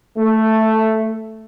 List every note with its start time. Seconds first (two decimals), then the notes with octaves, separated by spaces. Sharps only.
0.17 A3